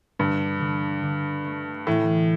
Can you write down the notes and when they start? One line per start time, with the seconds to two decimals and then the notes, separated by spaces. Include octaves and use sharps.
0.19 G2 D3
0.60 D3
1.03 D3
1.45 A3
1.87 A2 E3